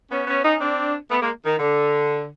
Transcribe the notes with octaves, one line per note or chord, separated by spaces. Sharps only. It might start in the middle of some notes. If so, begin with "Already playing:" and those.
B3 C#4
B3 C#4
C#4 D#4
C4 D4
A3 B3
G#3 A#3
D#3
D3